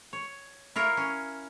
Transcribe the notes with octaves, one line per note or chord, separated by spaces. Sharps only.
C#5
E4 F4 A#4 C#5
C#4